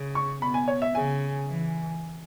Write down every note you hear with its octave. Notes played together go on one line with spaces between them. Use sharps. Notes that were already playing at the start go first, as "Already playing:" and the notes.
Already playing: C#3
C#6
B2 B5
G#5
C#5
E5
C#3 G#5
E3